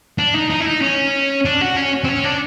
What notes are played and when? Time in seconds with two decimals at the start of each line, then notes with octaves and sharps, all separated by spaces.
0.18 D4
0.34 D#4
0.50 D#4
0.60 E4
0.66 D#4
0.82 C#4
1.45 D4
1.61 F#4
1.77 C#4
2.04 C4
2.08 C#4
2.24 D4